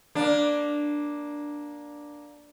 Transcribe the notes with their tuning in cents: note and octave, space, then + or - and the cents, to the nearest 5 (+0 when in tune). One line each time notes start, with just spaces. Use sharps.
A#3 +15 D4 +0